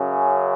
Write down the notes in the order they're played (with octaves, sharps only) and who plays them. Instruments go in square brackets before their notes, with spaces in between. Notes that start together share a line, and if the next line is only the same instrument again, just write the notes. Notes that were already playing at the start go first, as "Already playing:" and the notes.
Already playing: [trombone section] F#2 C#3